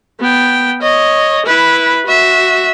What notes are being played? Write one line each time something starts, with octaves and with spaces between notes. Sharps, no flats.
B3 G5
C#5 D#5
E4 B4
F#4 E5